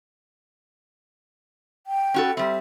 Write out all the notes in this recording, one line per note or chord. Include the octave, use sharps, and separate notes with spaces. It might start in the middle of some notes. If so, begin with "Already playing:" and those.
G5
C#4 F#4 A4
G3 C4 E5